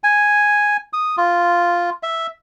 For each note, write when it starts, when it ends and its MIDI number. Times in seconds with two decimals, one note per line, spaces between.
0.04 0.77 80
0.93 1.16 87
1.17 1.90 65
2.03 2.27 76